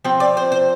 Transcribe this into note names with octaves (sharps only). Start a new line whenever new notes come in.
F3 C4 G5
D5
C5
C5